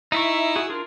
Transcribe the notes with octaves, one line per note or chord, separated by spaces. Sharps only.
D#4 E4 E5 C#6
F#4 G#4
D4 F4 A#4